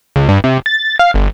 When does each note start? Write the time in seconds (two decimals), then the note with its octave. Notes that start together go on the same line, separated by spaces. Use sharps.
0.16 C#2
0.29 G2
0.44 C3
0.66 A6
0.99 F5
1.14 G1